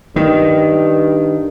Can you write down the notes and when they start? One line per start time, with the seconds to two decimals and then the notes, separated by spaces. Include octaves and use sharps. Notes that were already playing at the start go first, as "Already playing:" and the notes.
0.16 G2 D#3